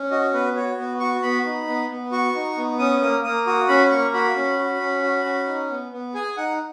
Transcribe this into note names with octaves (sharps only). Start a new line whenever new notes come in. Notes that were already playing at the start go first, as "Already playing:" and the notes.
Already playing: C#4
F#4 D#5
B3 B4
F#4 C#5
B3
F#4 C#6
B3 B5
D#4
B3
B3
F#4 C#6
D#4
B3
C#4 D#6
A#3 D#6
A#3 D#6
F#4 D#6
C#4 B5
A#3 C#6
F#4 B5
C#4
F#4
C#4
F#4
C#4
D#4
B3
B3
G#4 G#5
D#4 F#5